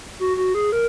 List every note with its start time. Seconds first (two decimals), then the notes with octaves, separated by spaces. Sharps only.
0.20 F#4
0.37 F#4
0.55 G#4
0.72 A#4